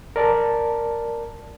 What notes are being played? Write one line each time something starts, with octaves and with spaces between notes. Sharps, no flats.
A#4 D5 A5